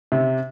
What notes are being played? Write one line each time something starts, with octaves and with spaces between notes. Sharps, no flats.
C3